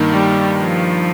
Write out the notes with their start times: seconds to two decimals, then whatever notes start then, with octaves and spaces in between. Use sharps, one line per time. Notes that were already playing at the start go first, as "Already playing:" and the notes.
Already playing: G2 D#3 A#3 D#4
0.12 G3
0.59 F3